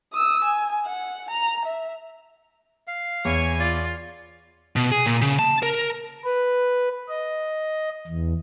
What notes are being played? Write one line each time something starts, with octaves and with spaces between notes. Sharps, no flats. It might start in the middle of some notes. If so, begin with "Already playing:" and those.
D#6 E6
G#5
F#5
A#5
E5
F5
E2 C#5 G#5
F4 D5
B2
G#4
A#2
C#3
A5
A#4
B4
D#5
E2